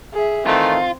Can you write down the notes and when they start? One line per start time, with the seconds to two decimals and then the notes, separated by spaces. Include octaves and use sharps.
0.14 G#4 E5
0.46 D#3 E3 A3 C4 F4